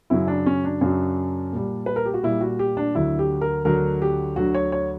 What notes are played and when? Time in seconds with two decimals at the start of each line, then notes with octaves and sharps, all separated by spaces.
0.10 F#2 C#3 F#3 E4
0.28 D4
0.46 C#4
0.64 D4
0.81 F#2 C#3 F#3
1.53 A#2 G3
1.86 B4
1.96 A#4
2.05 G4
2.14 F#4
2.23 A#2 G3 E4
2.41 F#4
2.59 G4
2.77 D4
2.95 D2 D3 F#3 E4
3.19 G4
3.41 A#4
3.65 D2 D3 F#3 A#4
4.02 G4
4.36 D2 D3 F#3 F#4
4.54 C#5
4.72 C#5